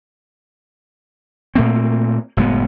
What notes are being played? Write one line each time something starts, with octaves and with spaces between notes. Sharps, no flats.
A#2 A3 A#3 C4
F#1 A2 G#3 B3